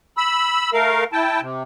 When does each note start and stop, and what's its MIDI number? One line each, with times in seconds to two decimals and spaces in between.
0.17 0.70 83
0.17 0.70 88
0.73 1.04 57
0.73 1.04 70
0.73 1.04 77
1.12 1.41 64
1.12 1.41 79
1.12 1.41 81
1.41 1.63 48